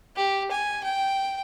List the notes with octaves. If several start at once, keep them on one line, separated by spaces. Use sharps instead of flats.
G4
G#5
G5